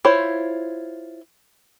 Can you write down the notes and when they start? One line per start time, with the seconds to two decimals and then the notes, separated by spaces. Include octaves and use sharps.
0.05 E4 F4 C5 C#5